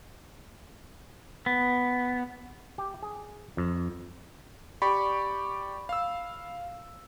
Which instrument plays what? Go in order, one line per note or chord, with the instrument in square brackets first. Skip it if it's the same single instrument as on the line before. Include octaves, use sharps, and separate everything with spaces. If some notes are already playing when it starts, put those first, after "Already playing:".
[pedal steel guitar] B3
[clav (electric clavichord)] G4
G#4
F2
[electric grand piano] G4 D5 C#6 [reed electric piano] B5
[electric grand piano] F5 E6